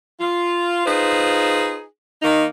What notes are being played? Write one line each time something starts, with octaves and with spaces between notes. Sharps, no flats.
F4
D#4 F4 G#4 B4 C5
D#3 A#3 D#4